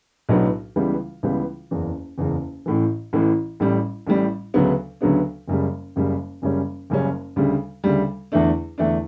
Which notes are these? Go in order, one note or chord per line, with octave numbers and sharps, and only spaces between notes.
B1 A2 F#3 B3 D4
C#2 C#3 E3 G3 B3
C#2 C#3 E3 G3 B3
F#1 E2 C#3
F#1 E2 C#3
A1 A2 E3
A1 A2 E3
A1 A2 G3
A1 A2 G3
D2 C#3 F#3 B3 D4
D2 C#3 F#3 B3 D4
F#1 F#2 C#3 G3
F#1 F#2 C#3 G3
F#1 F#2 C#3 G3 C#4
F#1 F#2 C#3 G3 C#4
D2 C#3 G3
D2 C#3 G3
E2 D3 A3 D4
E2 D3 A3 D4